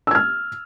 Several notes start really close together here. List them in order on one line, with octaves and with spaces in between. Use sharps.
E6 G#6 F6